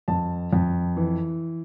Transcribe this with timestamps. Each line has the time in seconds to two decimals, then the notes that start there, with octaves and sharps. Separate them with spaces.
0.08 F2 A5
0.53 F2
0.97 E3